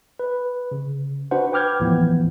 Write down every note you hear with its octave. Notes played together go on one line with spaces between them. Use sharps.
B4
C#3
D4 F#4 B4 C5 F#5
B4 G5 D6 F6 G6 G#6
D#2 A2 E3 F3 B3